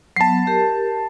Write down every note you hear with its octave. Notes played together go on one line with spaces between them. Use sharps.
F#3 B3 A5 C7
G4 A#4